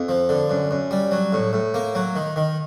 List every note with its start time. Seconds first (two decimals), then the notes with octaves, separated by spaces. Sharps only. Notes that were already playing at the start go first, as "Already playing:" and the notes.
Already playing: F2
0.09 F3
0.29 D3
0.50 F#2
0.71 F#2
0.91 G3
1.11 F#3
1.33 A2
1.53 A2
1.74 A#3
1.95 F#3
2.16 D#3
2.36 D#3